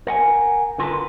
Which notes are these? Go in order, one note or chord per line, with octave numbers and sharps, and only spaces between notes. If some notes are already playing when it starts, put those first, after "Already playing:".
A#4 F#5 G#5
D3 F4 A#4 B4 A5